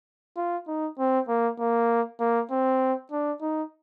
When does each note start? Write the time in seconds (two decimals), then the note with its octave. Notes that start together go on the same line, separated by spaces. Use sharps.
0.36 F4
0.68 D#4
0.99 C4
1.28 A#3
1.59 A#3
2.20 A#3
2.51 C4
3.11 D4
3.41 D#4